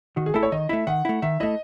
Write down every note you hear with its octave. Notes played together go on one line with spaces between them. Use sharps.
D#3 F#4
G#4
A3 E4 A4
C#5
D#3 D#5
A3 E4 E5
D#3 F#5
A3 E4
D#3 E5
A3 E4 D#5